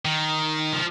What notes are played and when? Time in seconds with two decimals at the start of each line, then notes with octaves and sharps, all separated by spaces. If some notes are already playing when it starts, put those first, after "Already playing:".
0.05 D#3
0.73 F3